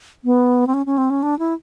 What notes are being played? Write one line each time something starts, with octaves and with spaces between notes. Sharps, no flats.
B3
C4
C#4
C#4
C4
C#4
D4
E4